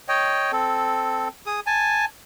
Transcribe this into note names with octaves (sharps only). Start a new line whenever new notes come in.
C#5 D#5 G5
C4 A4
G#4 D#6
G#5 A5